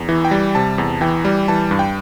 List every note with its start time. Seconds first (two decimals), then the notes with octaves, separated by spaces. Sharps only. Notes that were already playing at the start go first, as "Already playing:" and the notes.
Already playing: E2
0.09 E3
0.25 G5
0.31 G3
0.55 C3 A5
0.78 E2
1.01 E3 G5
1.25 G3
1.48 E3 A5
1.71 G2
1.79 G5